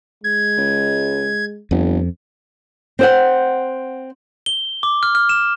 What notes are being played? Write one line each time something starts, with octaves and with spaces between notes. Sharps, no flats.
G#3 G#6
C#2
G1 F2
C4 C5 F#5
G7
D6
F6
F6
E7